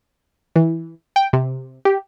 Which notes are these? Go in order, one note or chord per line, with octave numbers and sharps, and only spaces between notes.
E3
G5
C3
G4